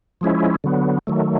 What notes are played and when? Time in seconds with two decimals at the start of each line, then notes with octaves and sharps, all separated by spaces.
0.21 F3 G#3 C#4 E4
0.64 D3 F#3 B3
1.07 D#3 F#3 A3